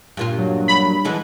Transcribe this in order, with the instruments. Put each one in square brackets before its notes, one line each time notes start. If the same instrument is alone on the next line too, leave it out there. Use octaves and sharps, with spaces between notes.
[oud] G2 A#2 F4
[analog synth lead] F#3
[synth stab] B5
[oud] D3 E3 G#3